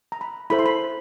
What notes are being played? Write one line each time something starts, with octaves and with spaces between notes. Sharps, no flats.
A#5
B5
E4 A4 C5 B5
C6
B5